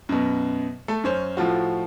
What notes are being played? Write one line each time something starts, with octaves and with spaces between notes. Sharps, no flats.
F#2 B2
A3 A4
F#2 C#4 C5
A2 F3 F4 F#4